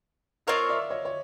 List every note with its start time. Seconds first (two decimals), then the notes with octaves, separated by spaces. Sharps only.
0.47 C4 F4 A#4 C#5 D#5 F5
0.69 D5 E5
0.90 C#5 D#5
1.05 C#5